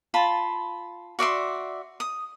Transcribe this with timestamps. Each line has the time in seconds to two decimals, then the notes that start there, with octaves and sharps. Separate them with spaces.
0.14 F4 A5 B5
1.19 F#4 D5 E5 C6
2.00 D#6